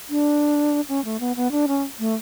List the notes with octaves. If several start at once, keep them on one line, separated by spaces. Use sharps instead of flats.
D4
C#4
A3
B3
B3
D4
C#4
A3